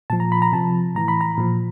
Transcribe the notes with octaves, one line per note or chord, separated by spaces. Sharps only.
A#2 F3 A5
A#5
B5
A#5
C3 F3 A5
A2 E3 A#5
B5
A#5
A#2 F3